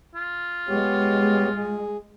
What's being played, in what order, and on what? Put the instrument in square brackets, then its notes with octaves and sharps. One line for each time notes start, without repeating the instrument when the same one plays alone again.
[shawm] F4
[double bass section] G#3 [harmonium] B3 G4 C#5
[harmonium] G#4